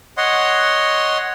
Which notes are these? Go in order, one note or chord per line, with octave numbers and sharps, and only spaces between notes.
C#5 D#5 F#5 C6